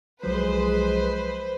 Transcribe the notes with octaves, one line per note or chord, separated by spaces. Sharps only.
B1 F3 F#3 G#3 B4 C5